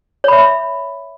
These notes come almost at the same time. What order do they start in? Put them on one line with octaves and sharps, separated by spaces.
C#5 B5 E5